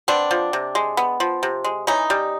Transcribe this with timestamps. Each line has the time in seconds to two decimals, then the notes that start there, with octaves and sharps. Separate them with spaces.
0.08 B3 C4 D4
0.31 F3
0.53 C3
0.75 G#3
0.97 B3
1.20 F3
1.43 C3
1.64 G#3
1.87 E3 C#4 D#4
2.10 G3